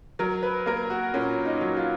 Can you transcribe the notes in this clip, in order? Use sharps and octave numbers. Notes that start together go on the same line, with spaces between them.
F#3 A#4
B4
A#3 A#4
F#4
A#2 C#4
D#4
F#3
F4